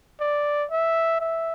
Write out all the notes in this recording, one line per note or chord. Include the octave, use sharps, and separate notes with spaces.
D5
E5
E5